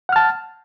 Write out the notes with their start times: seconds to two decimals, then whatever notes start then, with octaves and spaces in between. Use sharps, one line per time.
0.09 F#5
0.12 F6
0.16 A5